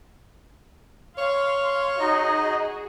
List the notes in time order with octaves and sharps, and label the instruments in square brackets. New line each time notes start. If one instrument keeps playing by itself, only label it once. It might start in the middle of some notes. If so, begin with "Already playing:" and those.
[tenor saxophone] C#5 [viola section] F5 C6
[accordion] D#4 D#5 [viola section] F#4 G#4